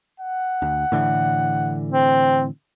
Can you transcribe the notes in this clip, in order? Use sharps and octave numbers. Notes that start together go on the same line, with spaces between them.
F#5
D2
A2 D3 E3
C4